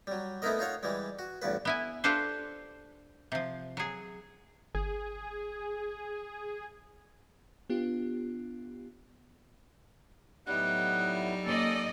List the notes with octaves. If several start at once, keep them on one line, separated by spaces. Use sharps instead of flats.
F#3 G3
A3 B3 D#4 E4 A#4 D#5
D#4 F4 C#5 F#5
E3 G3 G#3
F#4
A1 E2 G2 B4
B3 E4 G#5
D4 F4 G4 A4 B4 C5
C3 F3
F#3 G#4
G1 G#4
B3 D4 F4 G4
A2 F#3 G3 B3 D#4 E4 F#5
A#3 C#4 A4 D5 D#5